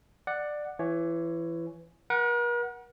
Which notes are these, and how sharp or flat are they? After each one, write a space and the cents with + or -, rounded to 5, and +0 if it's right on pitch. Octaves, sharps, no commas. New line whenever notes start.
D5 +15 F#5 +0
E3 +25 C#5 +0
A#4 +45 F#5 +0